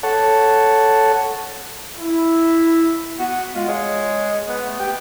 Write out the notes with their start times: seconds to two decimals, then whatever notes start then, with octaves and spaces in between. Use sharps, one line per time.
0.03 A4 C#5 F#5 A5
1.99 E4
3.19 B3 F#4
3.55 G#3 F4
3.68 G#3 C#5
4.48 B3 F#5
4.65 A3
4.80 G4 G5